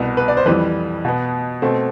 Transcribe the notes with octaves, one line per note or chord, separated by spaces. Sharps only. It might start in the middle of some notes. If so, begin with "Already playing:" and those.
Already playing: C2 B2 B3
B4
D5
C5
F2 E3 G3 B4
B2 B3
B2 A3 C4